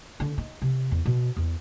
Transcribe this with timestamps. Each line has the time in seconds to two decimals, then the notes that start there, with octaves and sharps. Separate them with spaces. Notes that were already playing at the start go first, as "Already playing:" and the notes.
0.20 D3 D4
0.38 D#4
0.62 C3
0.91 E2
1.06 B2
1.37 E2